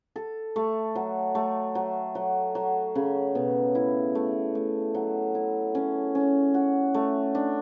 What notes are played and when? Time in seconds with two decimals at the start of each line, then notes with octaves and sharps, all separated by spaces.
0.16 A4
0.56 A3
0.95 F#3
1.35 A3
1.75 F#3
2.15 F#3
2.55 F#3
2.95 C#3
3.35 B2
3.75 E4
4.15 A3
4.55 A3
4.94 F#3
5.35 E4
5.75 C#4
6.15 C#4
6.54 F#4
6.94 A3
7.35 D4